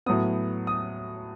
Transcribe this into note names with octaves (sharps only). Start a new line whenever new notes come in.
A2 F#3 B3 D#6
D#6